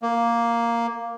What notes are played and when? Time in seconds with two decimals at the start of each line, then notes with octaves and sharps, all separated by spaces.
0.02 A#3